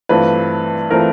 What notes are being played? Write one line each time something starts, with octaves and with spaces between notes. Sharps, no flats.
G2 E3 A3 C4 F4 B4
E3 A3 C4 F4 A#4